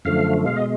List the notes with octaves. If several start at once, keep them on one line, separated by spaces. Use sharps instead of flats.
F#2 D3 F3 A3 F5
B2 G#3 F5
D#5